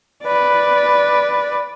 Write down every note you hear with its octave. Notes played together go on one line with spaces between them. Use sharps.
B4 D5